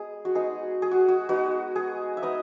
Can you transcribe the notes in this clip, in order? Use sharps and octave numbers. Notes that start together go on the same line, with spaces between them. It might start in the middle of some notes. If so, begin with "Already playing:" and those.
Already playing: G#3 B3 G#4
F#4
G#3 B3 D#4 G#4
G#4
F#4
F#4
G#3 B3 D#4 F#4
G#4
E5
G#3 B3 D#4 D#5